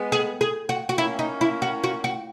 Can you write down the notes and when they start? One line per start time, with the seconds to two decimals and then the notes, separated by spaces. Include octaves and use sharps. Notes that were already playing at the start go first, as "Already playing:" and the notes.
Already playing: G#3 B3
0.12 G#4
0.41 G#4
0.69 F#4
0.89 F#4
0.97 A#3 C#4 E4
1.19 D#4
1.41 E4
1.62 F#4
1.84 F#4
2.04 F#4